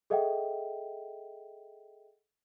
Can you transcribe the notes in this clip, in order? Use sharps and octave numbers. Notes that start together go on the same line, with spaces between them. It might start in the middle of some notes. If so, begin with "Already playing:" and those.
G#4 A4 D#5 E5 F#5 G5